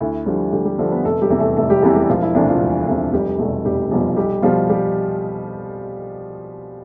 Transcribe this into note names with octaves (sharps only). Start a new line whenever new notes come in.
D2 E4
D3 F3 G3 G4
D2 G3 G4
G3 G4
D3 F3 A3 A4
B3 B4
F1 A3 A4
G3 G4
E2 C3 E3
A3 A4
F1 A3 A4
G3 G4
E2 C3 E3 E4
G3 G4
E1 F3 F4
E4
D2 C3 F3 D4
F3 F4
E1
D2 C3 F3
F1 G3 G4
E2 B2 G3 A3 A4
F1 G3 G4
E2 B2 F3 G3 F4
F4
B1 G3 G4
B2 F3 G3 F4
F4
G3 G4